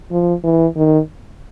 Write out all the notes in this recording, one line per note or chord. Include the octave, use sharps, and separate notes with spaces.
F3
E3
D#3